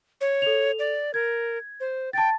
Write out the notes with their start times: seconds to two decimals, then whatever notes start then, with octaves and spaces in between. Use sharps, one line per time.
0.21 C#5
0.42 A4 F7
0.79 D5
1.14 A#4 G#6
1.80 C5
2.13 G5 A5 A6